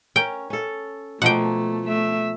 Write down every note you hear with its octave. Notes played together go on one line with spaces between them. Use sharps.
C#4 A#4 G5
C#4 A4
B2 F3 A3 A#3 F#5 G5
A3 E5